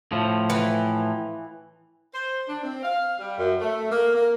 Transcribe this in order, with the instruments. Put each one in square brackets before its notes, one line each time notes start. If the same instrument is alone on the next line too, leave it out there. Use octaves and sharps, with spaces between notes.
[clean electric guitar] A2 F3
[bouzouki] E3
[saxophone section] C5
D4
C4
F5
G3
F#2
A3
A#3
A#3